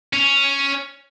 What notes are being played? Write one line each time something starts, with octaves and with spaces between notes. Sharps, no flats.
C#4